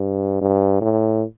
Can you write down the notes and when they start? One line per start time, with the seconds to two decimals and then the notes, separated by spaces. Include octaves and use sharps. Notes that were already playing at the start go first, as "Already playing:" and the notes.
Already playing: G2
0.41 G2
0.81 A2